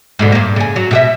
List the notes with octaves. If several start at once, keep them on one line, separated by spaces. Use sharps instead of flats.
G#2 B2 D3
G2 A#3
C#3 G#4
F#3
B2 G4 E5